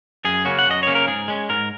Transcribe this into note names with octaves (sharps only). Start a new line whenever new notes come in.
F#2 G#4
C#3 A#3 C#4 F#4
F#5
F#2 D#5
C#3 A#3 C#4 C#5
A#4
G#2 G#4
G#3 C#4
G#2 A#4